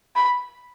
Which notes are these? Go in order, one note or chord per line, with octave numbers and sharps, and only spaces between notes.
B5